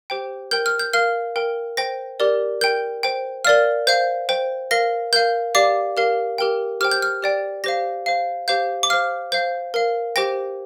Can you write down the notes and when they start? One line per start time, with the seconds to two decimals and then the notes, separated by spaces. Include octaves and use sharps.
0.10 G4 C5 G5
0.51 A#4 G5 G6
0.66 F6
0.79 G6
0.93 A#4 F5 F6
1.36 A#4 G5
1.77 C5 G5 A#6
2.20 G4 A#4 D5
2.61 A#4 G5 G6
3.03 C5 G5
3.45 A#4 D5 F5 F6
3.87 C5 F5 G6
4.29 C5 G5
4.71 A#4 F5 A#6
5.13 A#4 F5 G6
5.55 G4 D5 F5 D6
5.97 G4 A#4 F5
6.38 G4 A#4 G5
6.81 G4 C5 G5 F6
6.91 G6
7.02 F6
7.23 G4 D5 G5
7.64 G4 C5 F5 A#6
8.06 C5 F5
8.48 G4 C5 F5 G6
8.83 D6
8.90 C5 F5 F6
9.32 C5 F5 G6
9.74 A#4 F5
10.16 G4 C5 G5 A#6